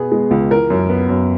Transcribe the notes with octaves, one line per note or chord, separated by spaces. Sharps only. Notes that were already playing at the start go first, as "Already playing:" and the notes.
Already playing: B2 B3 G#4
G#3
C#2
E3 A#4
F#2
B3
F#2